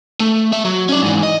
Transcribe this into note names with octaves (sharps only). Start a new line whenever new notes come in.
A3
A3 E5
F#3
C#4 D5
G#2 E3
D#5